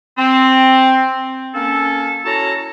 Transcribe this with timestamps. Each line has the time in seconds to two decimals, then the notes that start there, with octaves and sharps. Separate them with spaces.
0.18 C4
1.55 A#3 C#4 A4
2.25 C#4 E4 F#4 A4 A5 A#5